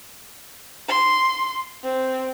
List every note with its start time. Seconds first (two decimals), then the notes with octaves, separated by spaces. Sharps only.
0.89 C6
1.83 C4